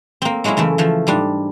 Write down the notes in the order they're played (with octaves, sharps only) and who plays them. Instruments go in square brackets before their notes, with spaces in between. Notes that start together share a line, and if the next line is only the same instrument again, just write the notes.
[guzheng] A#3 C4
F#3 G#3 A#3 C#4 E4
F#2 C#3 E3 A3
E3 F3 A3
G#2 G3 D4